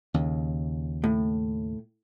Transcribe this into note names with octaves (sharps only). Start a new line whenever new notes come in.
D#2 C#3
A2